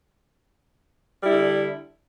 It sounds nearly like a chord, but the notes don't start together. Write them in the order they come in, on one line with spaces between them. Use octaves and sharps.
G3 E4 D3